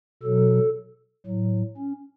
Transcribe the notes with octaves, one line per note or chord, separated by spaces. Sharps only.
B2 F#3 A4
A2 F#3
C#4